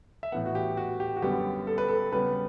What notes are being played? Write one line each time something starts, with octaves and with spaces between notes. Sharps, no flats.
E5
A2 E3 B3 F#5
F#4
G4
F#4
G4
F#4
F#2 D3 G3 B3 G4
A4
B4
A4
C#3 G3 B3 B4